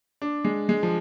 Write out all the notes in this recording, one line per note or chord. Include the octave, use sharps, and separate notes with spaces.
D4
G#3
G#3
F3